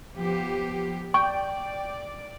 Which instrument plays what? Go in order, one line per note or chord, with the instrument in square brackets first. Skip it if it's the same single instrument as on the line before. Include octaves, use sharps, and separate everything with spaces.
[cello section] F3 B3 G4
[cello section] D5 [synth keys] G5 [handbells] C#6